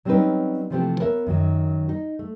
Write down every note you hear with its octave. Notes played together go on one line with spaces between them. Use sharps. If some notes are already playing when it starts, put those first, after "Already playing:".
F#3 G3 C4 C#4 D#4 B4
C3 E3 F3 A3 C4 G4
B3 A#4 C#5 E5
F#2 D#3 F#3
D#4
A3